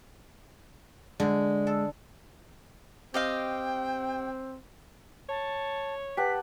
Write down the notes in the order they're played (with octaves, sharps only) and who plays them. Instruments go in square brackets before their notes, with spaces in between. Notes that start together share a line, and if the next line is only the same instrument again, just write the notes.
[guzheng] D3 [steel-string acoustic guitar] G#3
[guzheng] A4
[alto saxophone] C4 [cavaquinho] G4 D#5 F5 [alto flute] G5
[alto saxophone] C#5 [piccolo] A5
[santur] G4 F#5 A5 [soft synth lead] B4 [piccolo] B6